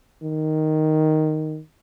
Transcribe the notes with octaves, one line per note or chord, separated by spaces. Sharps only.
D#3